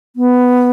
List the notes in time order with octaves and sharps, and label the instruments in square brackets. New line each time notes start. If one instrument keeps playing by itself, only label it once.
[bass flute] B3